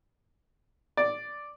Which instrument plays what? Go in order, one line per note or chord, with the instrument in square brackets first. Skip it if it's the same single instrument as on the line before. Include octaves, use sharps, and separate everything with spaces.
[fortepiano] D5